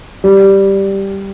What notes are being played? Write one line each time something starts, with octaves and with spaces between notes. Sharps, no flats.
G3